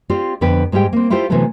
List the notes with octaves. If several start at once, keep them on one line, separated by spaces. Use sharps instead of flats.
C4 F4 G4 D5
F2 D3 B3 B4 G5
G#2 G3 G#3 G4 G5
A#3 C4
E4 F4 G4 A4 C5
C3 E3 F#3 A3 B3 A4